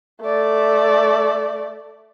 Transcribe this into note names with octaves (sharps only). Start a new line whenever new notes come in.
A3 D5